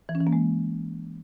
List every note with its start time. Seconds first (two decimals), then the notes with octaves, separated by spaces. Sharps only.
0.09 E3
0.15 C#4
0.21 E3
0.27 A#3
0.33 G#3